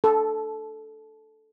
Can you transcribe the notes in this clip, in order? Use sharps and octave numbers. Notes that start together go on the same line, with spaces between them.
A4